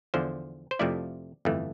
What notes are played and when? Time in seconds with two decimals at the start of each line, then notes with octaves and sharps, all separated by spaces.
0.14 E2 D3 F3 C5
0.71 C5
0.79 F2 C3 F3 A3 E4 D5
1.45 G1 F2 E3 A3